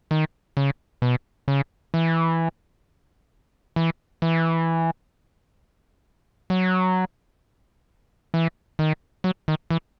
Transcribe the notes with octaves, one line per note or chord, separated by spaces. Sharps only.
D#3
C#3
B2
C#3
E3
E3
E3
F#3
E3
D#3
F#3
D#3
E3